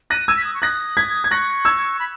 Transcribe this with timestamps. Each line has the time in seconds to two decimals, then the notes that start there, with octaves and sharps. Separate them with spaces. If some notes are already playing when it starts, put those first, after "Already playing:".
0.10 F#6 A#6 D#7
0.28 E6 G#6 D#7
0.37 B6
0.45 D#6
0.54 C#6
0.62 D#6 F#6 A#6
0.97 G#6 B6
1.24 G#6
1.31 C#6 F#6 A#6
1.65 E6 G#6
2.00 B5